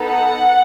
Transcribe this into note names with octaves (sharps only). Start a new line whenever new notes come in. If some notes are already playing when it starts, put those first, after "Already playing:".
Already playing: B3 D#4 A4
F#5